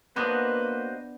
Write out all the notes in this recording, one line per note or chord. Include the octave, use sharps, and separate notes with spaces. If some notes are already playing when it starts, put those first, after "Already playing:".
A#3 B3 D4 F#4 B4 C5 D#5